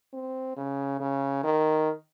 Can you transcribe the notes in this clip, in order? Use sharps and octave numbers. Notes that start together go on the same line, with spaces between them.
C4
C#3
C#3
D#3